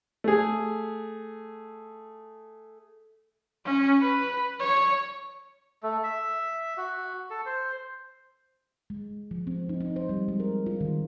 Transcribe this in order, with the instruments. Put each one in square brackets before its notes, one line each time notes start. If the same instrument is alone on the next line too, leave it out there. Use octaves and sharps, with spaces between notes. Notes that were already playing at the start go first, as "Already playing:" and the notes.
[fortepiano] A3 G#4
[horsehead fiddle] C#4
B4
C#5
[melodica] A3
E5
F#4
A4
C5
[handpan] G#3
F3
C4
D#4
D#4
C5
G3
G#3
A#4
F4
D#3